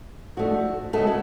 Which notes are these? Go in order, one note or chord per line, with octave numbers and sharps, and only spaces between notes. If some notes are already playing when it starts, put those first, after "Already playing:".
G#2 F3 A3 D4 F#4
C#3 G#3 A3 B3 A4
F#4